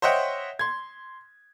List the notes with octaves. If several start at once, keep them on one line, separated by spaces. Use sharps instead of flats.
C5 C#5 D#5 E5 F#5 G5
C6 G#6